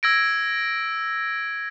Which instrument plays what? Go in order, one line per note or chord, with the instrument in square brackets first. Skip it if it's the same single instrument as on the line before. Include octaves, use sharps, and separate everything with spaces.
[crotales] E6 G#6 A#6 D7